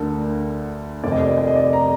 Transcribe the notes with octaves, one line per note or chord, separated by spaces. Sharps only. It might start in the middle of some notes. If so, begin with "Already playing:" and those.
Already playing: D2 D3 A4 A#4
F1 F2 C3 D#3 D5
D#5
D5
D#5
D5
D#5
D5
A#5